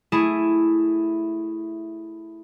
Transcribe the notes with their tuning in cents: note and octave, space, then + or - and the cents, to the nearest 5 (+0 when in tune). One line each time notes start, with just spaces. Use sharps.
A3 +0 E4 +0 G#4 +0